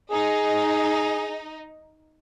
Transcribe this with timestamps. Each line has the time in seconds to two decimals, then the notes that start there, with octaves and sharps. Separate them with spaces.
0.10 D#4 G#4